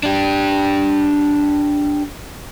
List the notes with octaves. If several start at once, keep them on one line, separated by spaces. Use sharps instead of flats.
D4 G4